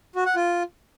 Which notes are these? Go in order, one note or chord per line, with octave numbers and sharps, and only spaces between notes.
F#4
F#5
F4